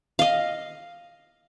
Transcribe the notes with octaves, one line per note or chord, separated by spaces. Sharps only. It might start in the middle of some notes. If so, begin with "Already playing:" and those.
D#5 F5